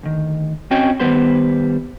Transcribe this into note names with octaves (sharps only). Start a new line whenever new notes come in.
D2 D#3
C4 C#4 F#4 C#5 D#5 G5
D#3 G3 B3 B4 C5 C6